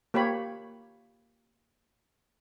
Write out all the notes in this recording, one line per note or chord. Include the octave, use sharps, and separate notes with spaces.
A#3 G4 C#5 B5